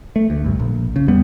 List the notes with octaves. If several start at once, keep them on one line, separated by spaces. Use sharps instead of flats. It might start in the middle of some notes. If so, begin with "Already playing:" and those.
A3
D2
B1 G2
A#1
C#3
E2 G3 B3